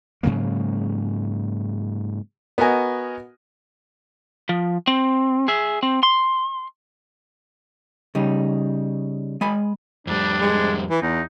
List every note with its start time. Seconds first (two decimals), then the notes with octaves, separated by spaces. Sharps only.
0.23 G#2 C#3 F#3 A#3
2.58 B3 F#4 A#4 D#5 G#5
4.49 F3
4.87 C4
5.48 G#4 E5
5.83 C4
6.03 C6
8.15 C#3 G3 D#4
9.41 G#3 G#5 B5
10.07 F2 G3 D4
10.41 G#3
10.91 E3
11.02 E2 D#4